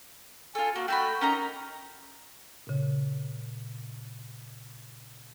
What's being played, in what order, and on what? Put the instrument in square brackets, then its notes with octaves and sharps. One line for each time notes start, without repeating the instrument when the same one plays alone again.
[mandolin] F4 A4 [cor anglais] G#5
[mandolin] A#3 [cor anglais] F#4
[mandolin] A3 F#4 B5 [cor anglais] G5
[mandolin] C#4 D#4 A#5 [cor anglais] A#4
[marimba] A#2 C#3